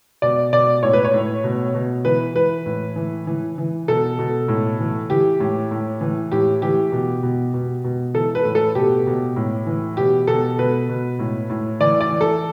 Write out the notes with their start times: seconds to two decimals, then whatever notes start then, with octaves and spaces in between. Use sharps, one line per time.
0.22 B2 D5
0.52 B2 D5
0.83 A2 C#5
0.93 B4
1.05 C#5
1.14 A2
1.44 B2
1.75 B2
2.05 E3 B4
2.36 E3 B4
2.66 A2
2.96 E3
3.27 E3
3.58 E3
3.88 B2 A4
4.19 B2
4.48 A2
4.80 E3
5.10 E3 G4
5.40 A2
5.71 A2
6.01 E3
6.32 A2 G4
6.62 E3 G4
6.92 B2
7.23 B2
7.54 B2
7.84 B2
8.14 E3 A4
8.35 B4
8.45 A2
8.55 A4
8.75 B2 G4
9.07 B2
9.36 A2
9.66 E3
9.97 B2 G4
10.27 B2 A4
10.58 B2 B4
10.89 B2
11.19 A2
11.50 A2
11.80 E3 D5
12.01 D5
12.11 E3
12.21 A4